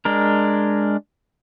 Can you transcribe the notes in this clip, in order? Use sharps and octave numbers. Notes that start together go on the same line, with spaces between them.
G#3 D4 A#4